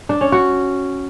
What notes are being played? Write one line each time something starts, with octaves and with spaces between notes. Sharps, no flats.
D4
C#4
F#4